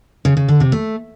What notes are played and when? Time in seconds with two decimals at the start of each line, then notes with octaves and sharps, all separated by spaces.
0.25 C#3
0.37 C#3
0.49 D3
0.60 C3
0.72 A3